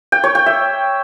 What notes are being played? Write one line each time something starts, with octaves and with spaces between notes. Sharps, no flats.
G5
C#5
G5
E5